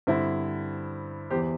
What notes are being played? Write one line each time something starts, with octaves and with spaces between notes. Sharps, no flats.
G2 D3 C4 E4
E2 E3 G4 C5